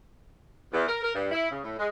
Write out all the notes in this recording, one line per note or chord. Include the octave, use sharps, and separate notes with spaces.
E2
A#4
A#4
G2
E4
C#3
A2
G#3